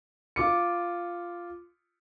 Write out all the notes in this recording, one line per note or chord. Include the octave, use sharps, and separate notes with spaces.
F4 D6 C#7